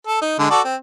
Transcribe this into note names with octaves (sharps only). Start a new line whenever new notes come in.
A4
D#4
D3 G#3
F#4 A4 D5
C4